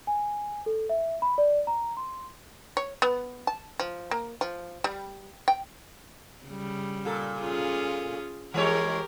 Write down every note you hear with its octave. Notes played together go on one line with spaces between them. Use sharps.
G#5
A4
E5
B5
D5
A#5
C6
C#5
B3
A5
F3
A#3
F3
G3
G5
C#3 G3
A#2 A4
C#4 F4 G#4
E3 G#3 G4 A#4 C#5